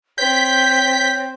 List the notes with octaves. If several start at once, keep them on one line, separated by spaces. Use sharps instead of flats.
C4 C#5 G6 B6